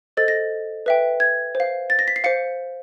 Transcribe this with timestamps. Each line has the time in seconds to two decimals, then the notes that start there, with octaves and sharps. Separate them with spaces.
0.17 A4 C5 D#5 A6
0.28 A#6
0.86 B4 E5 G5
1.20 G#6
1.55 C5
1.60 F5
1.90 A6
1.99 A#6
2.08 B6
2.16 C7
2.24 C5 F5 C#7